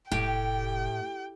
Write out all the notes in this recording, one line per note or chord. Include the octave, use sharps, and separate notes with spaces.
F1 A2 G4 G5